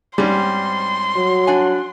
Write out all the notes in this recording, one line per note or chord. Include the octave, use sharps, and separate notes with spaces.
G#2 G3 C4 C#4 C6
F#3
D4 F#5 G#5